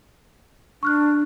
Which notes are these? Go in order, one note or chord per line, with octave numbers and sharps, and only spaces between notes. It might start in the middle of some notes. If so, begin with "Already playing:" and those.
D4 C#6 F6 F#6